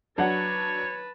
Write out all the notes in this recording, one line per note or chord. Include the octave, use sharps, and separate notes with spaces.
F#3 D4 B4 C#5 D5 F#5 A5